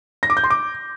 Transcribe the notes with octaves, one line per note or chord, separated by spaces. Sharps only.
A#6
D6
G6
C6
D6